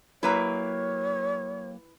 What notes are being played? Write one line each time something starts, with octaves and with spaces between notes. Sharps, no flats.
F#3 A#3 E4 G4 B4 C#5 A#5